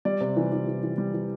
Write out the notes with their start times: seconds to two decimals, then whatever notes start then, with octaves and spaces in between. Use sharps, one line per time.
0.05 G3 D5
0.21 C3
0.37 E3
0.52 E3
0.67 E3
0.83 E3
0.98 G3
1.14 E3